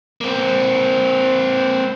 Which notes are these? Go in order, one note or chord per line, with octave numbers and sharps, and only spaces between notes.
A#3 C4